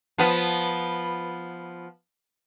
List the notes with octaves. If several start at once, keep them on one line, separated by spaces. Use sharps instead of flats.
F3 B3